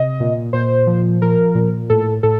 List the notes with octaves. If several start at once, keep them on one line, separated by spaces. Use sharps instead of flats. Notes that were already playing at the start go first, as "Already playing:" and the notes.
Already playing: C3 D#5
A#2
A#2 C5
F3
F3 A#4
A#2
A2 A4
A2 A4